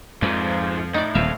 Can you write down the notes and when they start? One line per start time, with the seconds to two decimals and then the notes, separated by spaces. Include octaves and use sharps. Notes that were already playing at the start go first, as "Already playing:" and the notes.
0.22 F2 G#2 F3 B4 D5
0.94 A2 D#4 D5
1.15 D#1 E2 F3 E5 F5